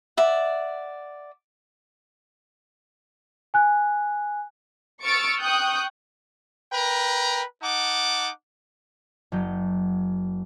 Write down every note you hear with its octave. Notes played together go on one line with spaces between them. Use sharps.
D5 E5 F#5
G#5 F#6
C#6 E6 F6 A6 C#7 D7
G5 C#6 D#6 F#6 G6
A#4 B4 G5 A#5
D#4 F#5 A5 D6
F#1 F#3 G6